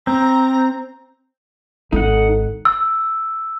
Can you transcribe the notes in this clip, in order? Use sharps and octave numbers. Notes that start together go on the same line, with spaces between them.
C4 A#5
G#1 D#4 A4 F#5
E6